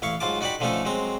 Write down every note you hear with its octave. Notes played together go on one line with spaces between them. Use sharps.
A1 E4 F5 C#6
G#2 F#3 F4 A5 D6
D#4 F#4 D5 G5 B5
D3 F3 A3 C#4 D#4 A4
F#3 G#3 C4 A#5